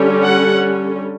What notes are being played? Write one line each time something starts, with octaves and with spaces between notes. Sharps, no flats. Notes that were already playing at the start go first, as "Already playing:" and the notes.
Already playing: D3 G3 C#4
F#5